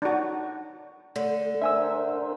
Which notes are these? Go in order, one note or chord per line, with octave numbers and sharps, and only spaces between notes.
D4 D#4 F#4
D3 A3
D4 A#4 C5 E5 G#5 E6